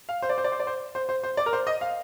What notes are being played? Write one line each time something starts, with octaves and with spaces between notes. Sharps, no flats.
F5
C5
D5
C5
D5
C5
D5
C5
C5
C5
C5
D5
A#4
C5
D#5
F5